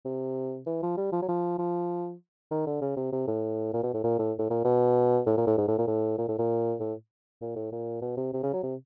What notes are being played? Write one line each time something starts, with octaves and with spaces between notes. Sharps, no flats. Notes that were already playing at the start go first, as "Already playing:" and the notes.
C3
E3
F3
G3
F3
F#3
F3
F3
D#3
D3
C#3
C3
C3
A2
A#2
B2
A2
A#2
A2
A2
A#2
B2
A2
A#2
A2
G#2
A2
A#2
A2
A#2
A2
A#2
A2
A#2
A2
A#2
B2
C3
C3
C#3
F#3
C3